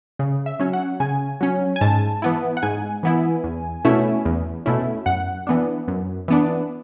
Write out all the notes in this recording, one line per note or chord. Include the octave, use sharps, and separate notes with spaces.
C#3
E5
F#3 C#4
F#5
C#3 G#5
F#3 C#4
G#5
G#2 A5
E3 B3 E4
F#5
G#2 G#5
E3 B3 E4
E2
B2 A3 C#4 E4
E2
B2 A3 C#4 E4
F#2 F#5
E3 B3 D4
F#2
E3 B3 D4